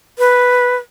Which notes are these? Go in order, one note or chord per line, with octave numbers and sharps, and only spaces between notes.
B4